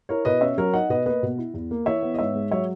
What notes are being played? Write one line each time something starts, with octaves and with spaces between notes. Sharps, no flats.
E4 A#4 C#5
B2 B4 D#5
C#4 C#5 E5
F#3 A#4 C#5
D#4 D#5 F#5
B2 B4 D#5
A#3 B4 D#5
B2
E4
E2
A#3
E3 C#5 E5
B3
D#5
G#2 C#5 E5
G#3
F#3 C#5 E5